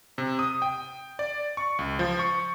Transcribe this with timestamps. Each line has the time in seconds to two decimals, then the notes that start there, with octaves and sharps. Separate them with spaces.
0.18 C3
0.39 D#6
0.62 G5
1.19 D5
1.57 C#6
1.79 C#2
1.99 F3
2.19 C#6